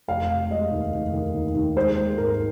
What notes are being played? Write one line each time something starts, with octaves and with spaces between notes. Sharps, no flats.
F1 F5
F1
G#3 D#5
D#2
F1
D#3
D#2
D#2
G#3 C5
G#3
G#1 A#4